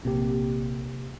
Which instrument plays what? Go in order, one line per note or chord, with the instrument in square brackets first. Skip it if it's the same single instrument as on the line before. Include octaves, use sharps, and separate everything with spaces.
[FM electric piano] A#1 C3 A#3 G4